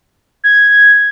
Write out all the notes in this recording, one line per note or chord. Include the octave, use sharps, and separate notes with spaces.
G#6